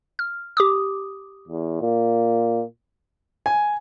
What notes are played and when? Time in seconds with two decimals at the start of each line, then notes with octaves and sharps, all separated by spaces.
0.19 F6
0.57 G4 D6 D#6
1.48 E2
1.81 A#2
3.46 G#5